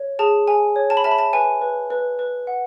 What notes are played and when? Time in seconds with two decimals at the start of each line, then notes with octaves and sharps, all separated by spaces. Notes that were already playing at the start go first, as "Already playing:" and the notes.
Already playing: C#5
0.19 G#4 A5
0.47 G#4 G#5
0.76 C#5
0.90 A5
0.97 B5
1.04 E5 A5
1.11 B5
1.18 A5
1.33 B4 G#5
1.61 B4
1.90 B4
2.19 B4
2.47 F#5